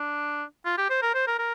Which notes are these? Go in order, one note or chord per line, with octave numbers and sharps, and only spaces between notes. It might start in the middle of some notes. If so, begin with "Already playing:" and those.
Already playing: D4
F4
G4
C5
A#4
C5
A#4
A#4